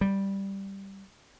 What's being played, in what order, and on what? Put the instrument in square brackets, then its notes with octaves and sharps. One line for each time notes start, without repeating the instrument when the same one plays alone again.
[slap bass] G3